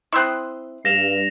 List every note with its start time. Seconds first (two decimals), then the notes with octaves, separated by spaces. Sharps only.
0.13 C4 E4 C6 D#6 F#6
0.85 G2 F5 A#6 E7 F7